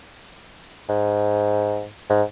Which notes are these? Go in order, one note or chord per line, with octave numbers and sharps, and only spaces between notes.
G#2
G#2